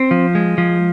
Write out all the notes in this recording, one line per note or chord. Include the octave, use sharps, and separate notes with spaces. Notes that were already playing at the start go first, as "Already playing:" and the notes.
Already playing: C4
F3
G#3
F3